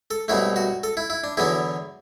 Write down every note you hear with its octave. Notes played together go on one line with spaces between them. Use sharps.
A4
C2 B2 F#3 A3 E4
F#4
A4
E4
E4
D4
E2 D3 F#3 B3 E4